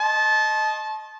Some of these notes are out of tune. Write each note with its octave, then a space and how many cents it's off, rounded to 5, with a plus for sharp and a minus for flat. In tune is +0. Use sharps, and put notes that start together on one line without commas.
D#5 +0 A5 -20 C6 +35